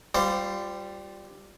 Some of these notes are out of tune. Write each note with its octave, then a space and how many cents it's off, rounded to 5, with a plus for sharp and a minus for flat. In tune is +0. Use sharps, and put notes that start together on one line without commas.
G3 +0 F4 +15 C5 -25